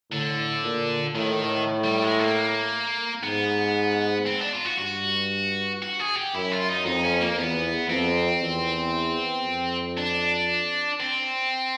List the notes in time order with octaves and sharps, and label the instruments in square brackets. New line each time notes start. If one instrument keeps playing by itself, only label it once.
[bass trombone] A2 [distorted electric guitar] D3
[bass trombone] A#2
[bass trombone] A2 [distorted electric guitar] D#3
[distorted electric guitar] G3
G#3
A#3
[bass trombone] G#2 [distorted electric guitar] B3
[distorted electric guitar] C4
D4
F4
F#4
[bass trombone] G2 [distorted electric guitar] F#4
[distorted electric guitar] F#4
G#4
G4
[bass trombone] F#2 [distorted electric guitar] E4
[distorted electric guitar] F4
D#4
[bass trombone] F2 [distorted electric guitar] D#4
[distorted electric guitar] C#4
A#3
[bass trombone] E2 [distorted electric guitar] B3
[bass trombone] F2 [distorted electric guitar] C4
[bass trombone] E2
F2
[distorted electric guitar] D4
C4